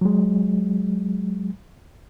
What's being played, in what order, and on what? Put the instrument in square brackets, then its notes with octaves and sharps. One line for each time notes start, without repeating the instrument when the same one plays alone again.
[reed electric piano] F#3 G#3